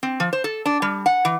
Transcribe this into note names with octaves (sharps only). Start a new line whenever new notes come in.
C4
F3
C5
A4
D4
G3
F#5
E3